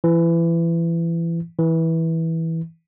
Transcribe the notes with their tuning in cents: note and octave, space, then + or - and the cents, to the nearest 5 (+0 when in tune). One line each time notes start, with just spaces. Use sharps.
E3 +25
E3 -15